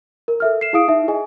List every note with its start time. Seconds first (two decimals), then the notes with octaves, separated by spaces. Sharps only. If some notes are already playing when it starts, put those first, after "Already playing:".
0.28 A#4
0.40 A4 E5 F6
0.61 C7 E7
0.73 E4 G#4 F5 D#6 D7
0.88 D#4 E5
1.08 G#4 D#5 G#5